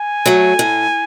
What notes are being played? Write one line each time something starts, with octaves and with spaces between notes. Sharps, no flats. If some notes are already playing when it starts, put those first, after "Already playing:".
Already playing: G#5
F#3 A3
A2